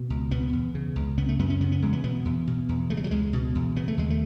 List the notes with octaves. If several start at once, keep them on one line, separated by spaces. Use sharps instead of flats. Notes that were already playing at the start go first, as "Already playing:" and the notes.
Already playing: B2
C#2
B2 B3
E2
C#3
C#2
C#3 B3
A3
F#2 B3
C#4
C#3 B3
B3
E2 G#3
B3
B2 B3
E2
B2
E2
C#3 A3
G#3
F#3
C#2 G#3
B2
E2
C#3 B3
A3
D#2 G#3
A3